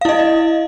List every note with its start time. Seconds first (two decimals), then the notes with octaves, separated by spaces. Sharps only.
0.01 F5
0.05 E4
0.09 D#5